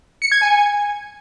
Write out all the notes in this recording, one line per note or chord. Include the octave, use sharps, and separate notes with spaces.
C#7
G#6
G#5